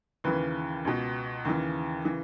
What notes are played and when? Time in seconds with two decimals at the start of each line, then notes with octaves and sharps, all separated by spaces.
0.24 D#2 C#3 E3 B4
0.85 C#2 B2
1.45 D#2 C#3 E3
2.05 C#3 E3